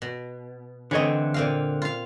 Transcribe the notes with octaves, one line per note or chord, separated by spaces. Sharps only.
B2
D3 E3 A3 C4 C#5 D#5
A#2 C4 F5
F4 F5